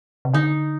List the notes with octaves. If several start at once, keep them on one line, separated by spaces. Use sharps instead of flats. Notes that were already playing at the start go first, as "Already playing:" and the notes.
C3
D3 D#4